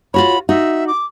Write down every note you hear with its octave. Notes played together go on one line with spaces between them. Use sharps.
F4 F#4 C#5 B5
D#4 F#4 E5
D6